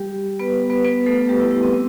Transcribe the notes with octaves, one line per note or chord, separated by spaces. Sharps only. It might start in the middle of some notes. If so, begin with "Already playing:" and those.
Already playing: G3 G4
B3 B4
B3 B4
B3 B4
A3 A4
G3 G4
E4
E4
C4
C4